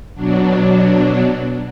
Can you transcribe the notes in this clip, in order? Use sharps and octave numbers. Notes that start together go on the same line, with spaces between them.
B2 F#3 D4